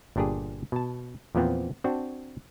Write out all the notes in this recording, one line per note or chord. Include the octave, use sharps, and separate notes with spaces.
G1 A#2 D4 G4 G#4
B2 A5
E2 A#2 F3 B3 C4
C4 D4 F#4 A5